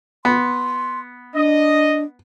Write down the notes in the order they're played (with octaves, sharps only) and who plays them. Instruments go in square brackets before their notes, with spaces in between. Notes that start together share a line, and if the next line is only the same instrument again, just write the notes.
[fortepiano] B3 [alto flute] C6
[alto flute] D4 [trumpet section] D#5